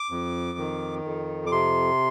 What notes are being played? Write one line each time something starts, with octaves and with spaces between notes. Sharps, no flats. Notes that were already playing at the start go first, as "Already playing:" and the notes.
Already playing: D6
F2
D#3
F2
D6
C3 C6